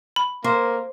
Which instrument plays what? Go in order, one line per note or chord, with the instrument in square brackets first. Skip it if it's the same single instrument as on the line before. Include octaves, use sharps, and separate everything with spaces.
[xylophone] B5
[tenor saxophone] A#3 [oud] C5